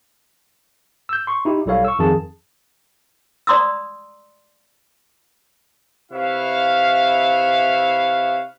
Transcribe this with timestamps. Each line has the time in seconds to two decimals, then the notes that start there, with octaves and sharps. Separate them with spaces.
1.09 E6 G6
1.27 C6 C#6
1.45 D#4 E4 G4
1.66 B1 G3 E4 A4 C#5 F5
1.85 C#6 E6
1.99 F2 D#3 G#4 A5
3.47 D5 A#5 C6 D#6 E6
6.12 C3 E4 B4 C#5 E5 F5